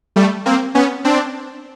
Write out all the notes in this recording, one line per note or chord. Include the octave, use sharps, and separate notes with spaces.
G3 A3
A#3 C4
B3 C#4
C4 D4